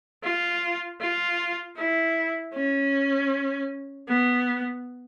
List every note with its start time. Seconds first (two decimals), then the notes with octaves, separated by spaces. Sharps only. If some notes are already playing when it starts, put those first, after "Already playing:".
0.23 F4
1.00 F4
1.77 E4
2.54 C#4
4.08 B3